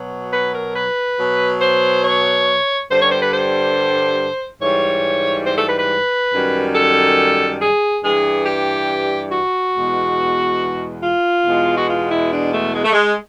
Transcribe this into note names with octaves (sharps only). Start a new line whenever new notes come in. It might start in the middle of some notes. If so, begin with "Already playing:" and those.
Already playing: B2 F#3
B4
A#4
B4
B2 F#3
C5
C#5
G2 D3 G3 C5
C#5
C5
B4
C5
G#2 E3 G3 C#5
C5
A4
B4
B4
F#2 D#3 G3
A4
G#4
G2 E3 G3 G#4
G4
F#4
E2 B2 G#3
F4
E2 B2 G#3
F#4
F4
E4
D4
A3
G#3
A3
G#3